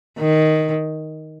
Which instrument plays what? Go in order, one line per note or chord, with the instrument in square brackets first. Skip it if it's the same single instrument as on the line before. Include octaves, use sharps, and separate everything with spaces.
[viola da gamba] D#3